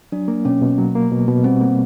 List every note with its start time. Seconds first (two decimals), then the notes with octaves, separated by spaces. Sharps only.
0.12 F#3 D4
0.28 A#3
0.45 B2 C#4
0.62 B2
0.78 F#3
0.95 A#3
1.11 B2
1.28 B2
1.44 G3 C4
1.61 A#3